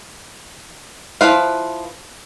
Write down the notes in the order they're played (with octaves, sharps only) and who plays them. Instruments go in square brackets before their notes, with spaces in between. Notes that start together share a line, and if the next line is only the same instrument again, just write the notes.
[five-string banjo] F3 E4 B4 F5